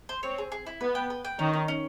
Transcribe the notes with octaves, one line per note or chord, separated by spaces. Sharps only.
C5
C4 C#5
G#4
G#4
E4
B3 B4
G5
B4
G5
D#3 C#4 D#4
C#4
C#4